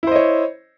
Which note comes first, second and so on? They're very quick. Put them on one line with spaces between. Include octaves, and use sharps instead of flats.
E4 C5 D#5 C#5